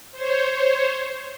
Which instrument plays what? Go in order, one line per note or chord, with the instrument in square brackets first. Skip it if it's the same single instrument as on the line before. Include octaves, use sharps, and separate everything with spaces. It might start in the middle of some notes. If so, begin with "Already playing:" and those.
[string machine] C5 C#5